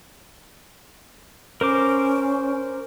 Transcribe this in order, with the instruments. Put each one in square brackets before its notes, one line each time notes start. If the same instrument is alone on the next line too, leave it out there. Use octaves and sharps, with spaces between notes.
[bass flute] C#4 [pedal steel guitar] A#4 C5 D6